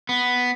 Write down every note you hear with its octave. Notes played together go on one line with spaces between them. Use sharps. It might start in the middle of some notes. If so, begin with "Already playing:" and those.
B3